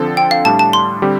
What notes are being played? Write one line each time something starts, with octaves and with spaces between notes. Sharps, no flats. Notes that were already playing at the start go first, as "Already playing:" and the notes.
Already playing: D3 F3 C4 A4
G5
F5
A2 G3 D4 A5
A5
C6
D3 G3 C4 G4